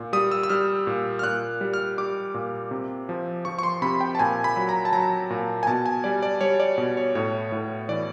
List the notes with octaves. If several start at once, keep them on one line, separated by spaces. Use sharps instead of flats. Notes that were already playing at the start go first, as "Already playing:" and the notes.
Already playing: A#2
G3 D#6
E6
E6
G3 F6
A#2
F6
A#2 F#6
G3
F6
G3 D6
A#2
C3
F3
F3 C#6
C#6
C6
C3 B5
G5
A5
A#2 G#5
B5
F#3
A#5
A5
F#3 A#5
A#2
G#5
B2 A5
G#5
G3 D5
D5
G3 C#5
D5
B2
C#5
A2 C#5
A2
E3 D5